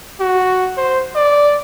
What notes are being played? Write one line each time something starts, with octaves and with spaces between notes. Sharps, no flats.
F#4
C5
D5